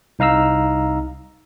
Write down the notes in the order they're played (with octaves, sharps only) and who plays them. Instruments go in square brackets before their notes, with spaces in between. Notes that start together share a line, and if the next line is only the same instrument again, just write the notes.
[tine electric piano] C2 D#4 F5 A#5 E6